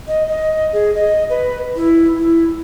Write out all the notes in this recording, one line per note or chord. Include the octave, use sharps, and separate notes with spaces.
D#5
D#5
G#4
D#5
B4
E4
E4